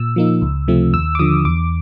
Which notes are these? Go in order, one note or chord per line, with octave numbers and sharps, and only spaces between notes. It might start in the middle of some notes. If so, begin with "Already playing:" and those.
Already playing: A#2 E6
F3 A#3 D#4
C#2
C3 F3 A3 C4
D#2 E6
D6
D3 F3 D#6
E2 D6